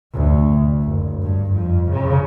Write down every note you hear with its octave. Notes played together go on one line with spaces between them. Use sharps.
D2
F#1
G2
F2
C#3